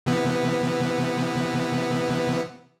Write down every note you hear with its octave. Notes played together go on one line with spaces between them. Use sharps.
C3 E3 B3